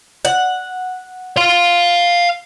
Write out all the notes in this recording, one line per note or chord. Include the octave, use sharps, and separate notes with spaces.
F#5
F5 C6